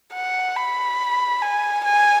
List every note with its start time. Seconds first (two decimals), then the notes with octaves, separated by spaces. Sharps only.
0.14 F#5
0.57 B5
1.42 G#5
1.85 G#5